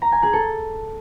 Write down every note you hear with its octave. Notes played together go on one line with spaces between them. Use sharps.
A#5
G#5
G#4
A4